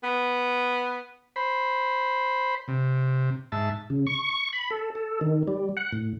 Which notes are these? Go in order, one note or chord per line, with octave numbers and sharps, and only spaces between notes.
B3
C5 B5
C3
G#2 E5 A5
C#3
C#6
B5
A4
A4
D#3
G3
F#5
A2